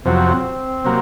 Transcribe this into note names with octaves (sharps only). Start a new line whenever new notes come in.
F2 C3 F#3 C4
C3 F#3 A#3